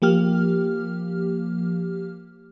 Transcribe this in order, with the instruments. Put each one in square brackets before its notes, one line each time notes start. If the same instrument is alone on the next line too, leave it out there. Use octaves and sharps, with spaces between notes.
[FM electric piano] F3 A#3 G4 F6